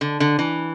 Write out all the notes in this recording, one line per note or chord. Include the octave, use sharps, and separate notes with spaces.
D3
D3
E3